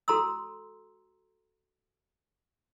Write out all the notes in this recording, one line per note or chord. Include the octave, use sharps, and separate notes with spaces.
F#4 A4 A#5 C6 E6